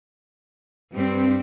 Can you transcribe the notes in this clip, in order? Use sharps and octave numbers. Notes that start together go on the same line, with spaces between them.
G2 G3 C4